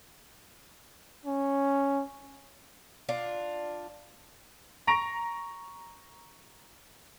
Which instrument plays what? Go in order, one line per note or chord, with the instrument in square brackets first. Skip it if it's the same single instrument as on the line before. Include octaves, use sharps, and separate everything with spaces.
[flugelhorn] C#4
[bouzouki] D4 F4
[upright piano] A#5 C#6 A#6 D7 F7